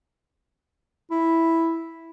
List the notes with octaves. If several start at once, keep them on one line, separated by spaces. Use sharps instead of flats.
E4